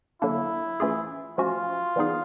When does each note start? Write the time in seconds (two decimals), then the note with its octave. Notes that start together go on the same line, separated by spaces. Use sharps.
0.22 D3 F#3 A#3 D4 E4
0.80 E3 A3 C#4 F4 G#4
1.38 F3 A3 C#4 F4 F#4
1.96 E3 G3 B3 D#4 G#4